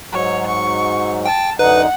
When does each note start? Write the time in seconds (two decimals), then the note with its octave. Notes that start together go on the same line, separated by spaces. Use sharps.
0.13 G#2 F#3 C#5
0.47 C#6
1.26 G5 A5
1.59 F#2 D3 D#4 B4 F#5